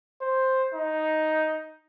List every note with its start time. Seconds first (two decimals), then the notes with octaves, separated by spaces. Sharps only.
0.21 C5
0.74 D#4